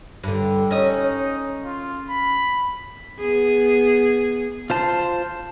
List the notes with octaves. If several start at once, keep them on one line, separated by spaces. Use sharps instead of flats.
G2 D3
C#4 D#4 D#5
F4
B5
B3 G#4
F4 C5 A5 C6